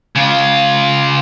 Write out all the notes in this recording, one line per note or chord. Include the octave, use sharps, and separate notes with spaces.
C#3 F4